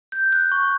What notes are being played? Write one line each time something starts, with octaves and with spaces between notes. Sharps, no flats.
G6
F#6
C#6